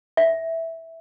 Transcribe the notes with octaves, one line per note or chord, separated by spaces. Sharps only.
E5